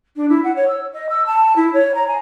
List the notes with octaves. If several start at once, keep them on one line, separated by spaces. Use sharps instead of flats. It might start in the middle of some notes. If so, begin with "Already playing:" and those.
D4
E4
F#5
C#5
E6
D#5
E6
A5
E4
C#5
A#5
G#5